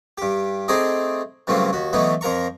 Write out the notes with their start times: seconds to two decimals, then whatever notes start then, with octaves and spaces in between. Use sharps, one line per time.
0.18 G2 G4
0.68 A3 C4 D#4 G#4 D5 D#5
1.47 G2 C#3 F#3 A3 A#3 C4
1.73 D#2 F#4
1.93 D3 E3 F#3 A3 B3 D#4
2.21 F2 F3 A#4 A#5 C#6